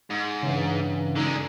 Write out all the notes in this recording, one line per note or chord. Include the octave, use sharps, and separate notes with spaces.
G#2
G2 C#3 E3
D3 G#3 D#4